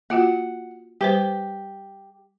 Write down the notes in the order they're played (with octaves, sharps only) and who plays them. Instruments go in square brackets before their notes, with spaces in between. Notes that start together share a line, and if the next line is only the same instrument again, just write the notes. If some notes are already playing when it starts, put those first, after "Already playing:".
[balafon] A#3 F4 F#4 [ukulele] F#5
[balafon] G3 B4 C5 [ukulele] G4